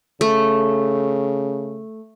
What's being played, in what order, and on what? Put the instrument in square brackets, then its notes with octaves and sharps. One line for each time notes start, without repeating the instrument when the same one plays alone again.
[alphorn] C#3 [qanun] A3